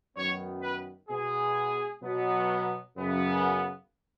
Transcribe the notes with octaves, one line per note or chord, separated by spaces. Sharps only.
F#2 D#3 B3 C#5
B4
B2 G#3 B3 G#4
B2 F#3 B3
F#2 C#3 B3